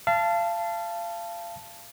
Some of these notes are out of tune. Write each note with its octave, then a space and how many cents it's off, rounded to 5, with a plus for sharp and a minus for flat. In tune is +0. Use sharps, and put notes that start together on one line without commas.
F5 -30 A5 +0